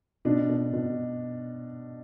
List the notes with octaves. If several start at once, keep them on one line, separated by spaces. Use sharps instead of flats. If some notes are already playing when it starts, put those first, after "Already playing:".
B2 D4
B2
B2